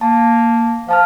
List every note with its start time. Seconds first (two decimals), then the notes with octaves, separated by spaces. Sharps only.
0.01 A#3 A5
0.88 F3 F5 A5 F6